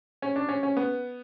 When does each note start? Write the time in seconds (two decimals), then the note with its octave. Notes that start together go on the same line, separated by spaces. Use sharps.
0.22 C#4
0.36 D4
0.49 C#4
0.63 C#4
0.77 B3